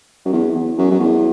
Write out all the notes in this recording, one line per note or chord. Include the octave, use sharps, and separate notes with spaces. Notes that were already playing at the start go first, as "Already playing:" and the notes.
F#2
E2
E2
F#2
F#2
E2